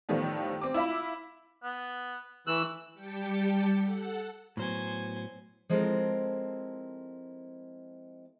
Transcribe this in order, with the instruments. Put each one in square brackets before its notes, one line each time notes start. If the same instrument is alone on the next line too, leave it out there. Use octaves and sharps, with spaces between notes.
[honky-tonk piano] A2 D#3 F3 G3 A3 B3
C4 D6
E4 F4 E5 B5
[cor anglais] B3
[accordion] E3 E6 F#6 [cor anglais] A3
[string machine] G3 G4 G5 A5 C#7
A4 F#5
[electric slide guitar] A2 F#3 B3 [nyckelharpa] C5 G#5
[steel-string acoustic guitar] F3 G#3 C4 E4 A4 A#4